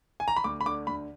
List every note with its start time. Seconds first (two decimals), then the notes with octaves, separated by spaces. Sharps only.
0.20 G#5
0.28 A#5
0.36 B5
0.44 D2 D6
0.61 B5
0.66 D3 D6
0.87 D2 B5